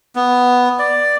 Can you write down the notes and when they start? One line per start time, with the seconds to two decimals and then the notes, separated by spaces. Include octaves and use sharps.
0.15 B3
0.79 D5